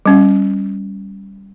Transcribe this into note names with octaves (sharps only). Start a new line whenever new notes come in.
G3 C#4